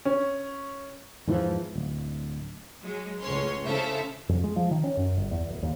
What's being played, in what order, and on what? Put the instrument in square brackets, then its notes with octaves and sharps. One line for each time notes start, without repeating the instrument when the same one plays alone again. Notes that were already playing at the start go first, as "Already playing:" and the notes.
[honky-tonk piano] C#4
[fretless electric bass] E2 G#2 E3 F3
D1
[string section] F#3 G#3
C#2 A2 G#3 C#4 C#5 C6
C#3 E4 A4 C5 E5 F5
[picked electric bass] F2
G#3
F3
D#3
C#4
F#2
G1
E2
D1
D#2